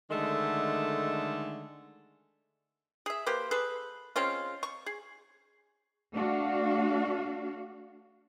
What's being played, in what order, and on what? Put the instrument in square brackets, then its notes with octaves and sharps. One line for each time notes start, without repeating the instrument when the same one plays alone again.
[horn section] D3 D#3 G#3 A3
[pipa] G#4 E5
A#3 G4 B4 C5
G#4 A4 B4
G#3 C4 C#4 F4
C#6
G#4
[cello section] A3 D4 F#4 F5